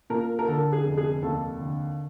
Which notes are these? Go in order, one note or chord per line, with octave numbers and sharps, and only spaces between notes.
A#2 A#4
A#4
D3 A4
G#4
F1
G#4
D#2 A4
D3